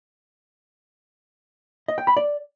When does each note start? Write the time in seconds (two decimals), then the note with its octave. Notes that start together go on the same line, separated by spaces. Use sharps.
1.88 D#5
1.98 G5
2.07 B5
2.17 D5